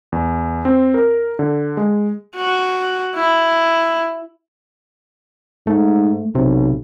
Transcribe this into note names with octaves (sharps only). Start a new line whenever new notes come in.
E2
C4
A#4
D3
G#3
F#4
E4
G#2 A3
B1 C3